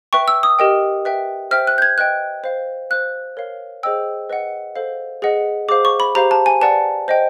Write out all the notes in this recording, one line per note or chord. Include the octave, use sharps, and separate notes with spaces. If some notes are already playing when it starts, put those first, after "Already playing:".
B4 E5 G5 C#6
E6
D#6
G4 A#4 D#5 G5
B4 E5 G5
C5 E5 G5 F6
F#6
G6
G#6
B4 D#5 G5 F#6
C5 F5
C5 F5 F#6
A#4 C#5 F5
G#4 C5 D#5 G5 E6
B4 D#5 F#5
A4 C5 F5
G#4 B4 D#5 F#5
G#4 C5 F5 D6
C#6
B5
G4 C5 F5 A#5
A5
G#5
B4 D5 F#5 A5
C5 D#5 G5